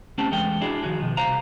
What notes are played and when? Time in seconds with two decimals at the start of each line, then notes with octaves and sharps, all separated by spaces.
0.18 A3 C4 C#4 G4 A4
0.31 E2 E3 G#3 A4 G5
0.61 D4 E4 F#4 G#4 D5
0.82 D#3 F3 F#4 G#4
1.00 B2 D#3 F3
1.17 C2 C5 F5 A#5